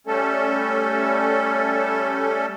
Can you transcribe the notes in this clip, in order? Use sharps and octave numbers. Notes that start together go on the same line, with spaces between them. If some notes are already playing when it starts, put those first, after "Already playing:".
G3 A3 C#4 A4